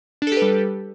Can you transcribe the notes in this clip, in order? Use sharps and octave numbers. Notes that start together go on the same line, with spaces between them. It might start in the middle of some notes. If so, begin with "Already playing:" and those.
G3 D4 G4 A4 B4